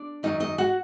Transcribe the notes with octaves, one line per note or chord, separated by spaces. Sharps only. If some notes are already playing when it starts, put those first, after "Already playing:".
Already playing: D4 D5
F#2 D#3 F#3 D#4 D#5
D#4 D#5
F#4 F#5